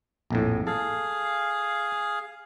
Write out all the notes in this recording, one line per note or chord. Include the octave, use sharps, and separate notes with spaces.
A#1 F2 A2
G#4 A4 F5